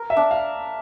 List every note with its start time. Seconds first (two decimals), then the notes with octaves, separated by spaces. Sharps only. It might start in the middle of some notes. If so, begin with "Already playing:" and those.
Already playing: A#4
0.10 E5
0.17 D4
0.31 F5